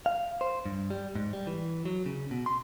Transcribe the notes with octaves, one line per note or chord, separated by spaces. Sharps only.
F5
C5
G2
G3
G#2
G3
E3
F#3
C#3
B2
C6